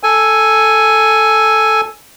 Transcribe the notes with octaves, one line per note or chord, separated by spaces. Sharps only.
A4 G#5